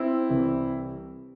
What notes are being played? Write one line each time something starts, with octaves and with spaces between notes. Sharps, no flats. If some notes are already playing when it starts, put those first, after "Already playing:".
Already playing: C4 E4
C2 C3 E3 G3